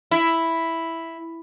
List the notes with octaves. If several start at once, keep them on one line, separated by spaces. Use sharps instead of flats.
E4